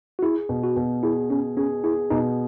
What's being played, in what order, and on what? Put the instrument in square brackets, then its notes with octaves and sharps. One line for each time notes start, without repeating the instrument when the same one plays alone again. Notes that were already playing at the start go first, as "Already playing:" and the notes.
[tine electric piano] F#4
[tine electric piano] E4 [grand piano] G#4
[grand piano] B2
[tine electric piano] F#4
[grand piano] B2
[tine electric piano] E4 [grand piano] G#4
[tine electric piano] C#4 [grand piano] G#4
[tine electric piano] C#4 [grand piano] G#4
[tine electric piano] E4 [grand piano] G#4
[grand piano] B2 [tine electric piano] D#4